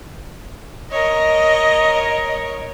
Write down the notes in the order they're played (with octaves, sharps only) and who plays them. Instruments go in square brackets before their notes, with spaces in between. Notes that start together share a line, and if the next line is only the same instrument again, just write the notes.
[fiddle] A#4 C#5 [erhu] D#5